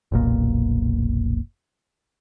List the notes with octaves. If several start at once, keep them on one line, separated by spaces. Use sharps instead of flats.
F1 B1 A#2